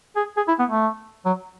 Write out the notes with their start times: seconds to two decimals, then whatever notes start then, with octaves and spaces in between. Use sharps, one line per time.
0.16 G#4
0.37 G#4
0.48 E4
0.59 B3
0.70 A3
1.25 F#3